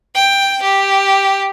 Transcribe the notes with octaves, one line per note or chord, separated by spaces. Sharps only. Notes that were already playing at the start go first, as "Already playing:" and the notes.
G5
G4